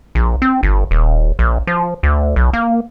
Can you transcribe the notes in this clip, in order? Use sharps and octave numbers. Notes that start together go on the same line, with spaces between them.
A#1
C4
G1
D#1
A#1
F3
D2
B1
A#3